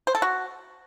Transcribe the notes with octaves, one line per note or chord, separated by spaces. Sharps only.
C5
A4
F#4